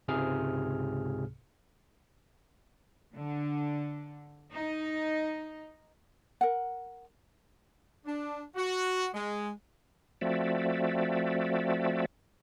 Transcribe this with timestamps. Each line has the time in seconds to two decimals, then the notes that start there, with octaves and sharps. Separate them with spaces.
0.08 C#2 G#2 C3 G#4 F6
3.14 D3
4.53 D#4
6.41 A#4 F#5
8.05 D4
8.55 F#4
9.14 G#3
10.21 F3 A3 C4 F#4 D5 E5